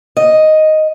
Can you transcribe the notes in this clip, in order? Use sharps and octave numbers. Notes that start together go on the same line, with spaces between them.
D#5